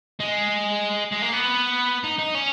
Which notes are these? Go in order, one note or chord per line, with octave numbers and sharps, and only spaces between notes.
G#3
G#3
A#3
B3
D#4
D#4
C#4